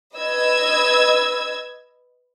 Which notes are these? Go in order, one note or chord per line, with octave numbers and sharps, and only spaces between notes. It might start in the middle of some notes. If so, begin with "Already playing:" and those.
B4 D#5 E6 G#6